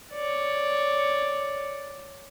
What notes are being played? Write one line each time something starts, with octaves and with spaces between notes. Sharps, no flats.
C#5 D5